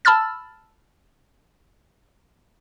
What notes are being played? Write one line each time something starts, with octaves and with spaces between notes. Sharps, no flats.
A5 B5 E6 F6 A6